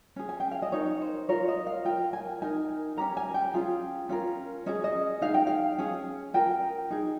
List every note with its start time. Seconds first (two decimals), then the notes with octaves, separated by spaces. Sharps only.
0.16 C#4 G#4
0.29 G#5
0.40 G5
0.51 F5
0.62 D#5
0.72 D#4 A#4 C#5
1.02 C5
1.29 F4 A#4 C#5
1.48 D#5
1.67 F5
1.85 F4 A#4 G5
2.13 G#5
2.42 D#4 A#4 G#5
2.96 C#4 G4 A#4 A#5
3.17 G#5
3.34 G5
3.54 C#4 F4 G#4
4.09 C#4 F4 A#4
4.66 C#4 G#4 D#5
4.84 D#5
5.22 D#4 G#4 F5
5.34 G5
5.47 F5
5.78 C#4 G#4
6.34 F4 A#4 G5
6.91 D#4 G#4